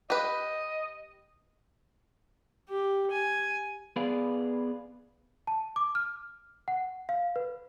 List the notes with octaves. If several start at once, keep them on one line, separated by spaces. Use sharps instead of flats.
G4 B4 D#5
G4
G#5
B3 G#4 B4 D5 F5
A5
D6
F6
F#5
F5
B4